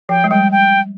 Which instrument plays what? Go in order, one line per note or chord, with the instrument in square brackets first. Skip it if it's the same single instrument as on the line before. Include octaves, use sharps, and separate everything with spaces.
[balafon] F3 [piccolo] G5
[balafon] G#3
[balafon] G3 [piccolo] G5
[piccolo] G5